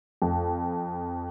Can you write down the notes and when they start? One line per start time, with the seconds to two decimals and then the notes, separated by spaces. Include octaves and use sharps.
0.22 F2